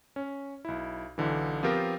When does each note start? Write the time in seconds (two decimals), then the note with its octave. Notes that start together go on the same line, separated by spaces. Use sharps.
0.16 C#4
0.65 B1 E4
1.18 B1 D3 E3
1.63 F3 B3 C4 F4 G4 A#4